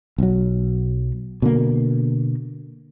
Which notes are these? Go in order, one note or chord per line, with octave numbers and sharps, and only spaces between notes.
B1 F#3
B2 D3 A#3